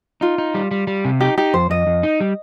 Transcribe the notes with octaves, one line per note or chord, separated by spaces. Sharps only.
D#4 F4
D#4
G3
G3
G3
C3
D#4 G4
D#4 G4
F2 C5
F2 D#5
F2
D#4
G3